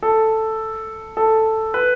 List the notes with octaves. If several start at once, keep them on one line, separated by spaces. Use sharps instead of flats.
A4
A4
B4